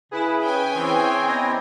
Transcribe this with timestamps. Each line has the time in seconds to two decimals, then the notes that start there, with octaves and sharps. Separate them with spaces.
0.12 C#3 E4 G#4 B4
0.43 C#4 G5 G#5
0.75 E3 C4 G#4 C#5
1.28 B3 E4 D5 D#5 A#5